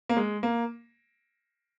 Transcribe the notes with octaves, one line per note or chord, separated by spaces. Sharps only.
A#3
G#3
A#3